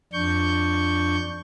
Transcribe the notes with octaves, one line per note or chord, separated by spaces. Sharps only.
F2 D4 C#6 G6